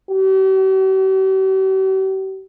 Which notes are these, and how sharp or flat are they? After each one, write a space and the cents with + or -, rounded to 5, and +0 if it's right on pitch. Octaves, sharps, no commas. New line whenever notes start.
G4 -45